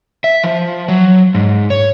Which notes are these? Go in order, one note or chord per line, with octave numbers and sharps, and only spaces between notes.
E5
F3
F#3
G#2
C#5